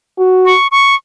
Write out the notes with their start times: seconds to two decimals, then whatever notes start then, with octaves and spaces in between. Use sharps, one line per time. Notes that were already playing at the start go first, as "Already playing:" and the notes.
0.18 F#4
0.46 C#6
0.71 C#6